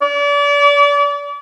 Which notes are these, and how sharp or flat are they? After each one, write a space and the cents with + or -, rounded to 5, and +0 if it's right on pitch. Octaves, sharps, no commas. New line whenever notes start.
D5 -35